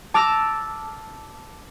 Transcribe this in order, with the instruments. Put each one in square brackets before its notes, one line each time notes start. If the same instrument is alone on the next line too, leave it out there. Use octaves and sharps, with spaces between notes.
[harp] A5 D6 E6 F6 A#6